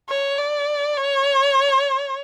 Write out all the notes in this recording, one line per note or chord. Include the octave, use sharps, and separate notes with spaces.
C#5
D5
C#5